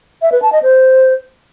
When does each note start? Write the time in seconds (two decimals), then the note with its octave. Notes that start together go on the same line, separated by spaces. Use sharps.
0.22 E5
0.32 B4
0.42 A5
0.52 D#5
0.63 C5